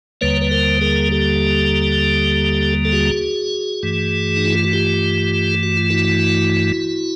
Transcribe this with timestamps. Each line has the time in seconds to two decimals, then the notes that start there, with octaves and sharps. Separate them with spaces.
0.21 D#2 D3 G3 A#3 B4 C#5
0.41 B4
0.51 A#4 C5
0.81 G#4 A#4
1.11 G4 A4
2.85 A4
2.92 F#4 G#4
3.83 G2 E3 A3
4.37 D#4
4.45 E4
4.55 F4
4.64 F#4
4.73 F4 G4
5.63 F#4
5.77 F4
5.90 E4 F#4